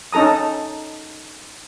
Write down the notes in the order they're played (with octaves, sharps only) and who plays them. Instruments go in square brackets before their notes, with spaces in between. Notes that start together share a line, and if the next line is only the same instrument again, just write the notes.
[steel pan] C#4 D#4 A4 A#5 D#6